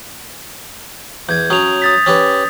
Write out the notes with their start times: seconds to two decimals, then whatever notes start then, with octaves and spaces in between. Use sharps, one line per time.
1.29 E2 G6 G#6
1.50 F#3 C#4 D#6 F7
1.82 D#6 A6 B6
2.06 C#4 G4 B4